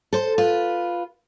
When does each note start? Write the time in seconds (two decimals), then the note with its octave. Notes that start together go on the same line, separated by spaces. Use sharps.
0.13 A4 C5
0.38 F4 B4